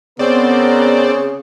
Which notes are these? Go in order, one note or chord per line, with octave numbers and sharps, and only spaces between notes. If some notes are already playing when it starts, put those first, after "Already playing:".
C#3 B3 C4 A#4 C5 D5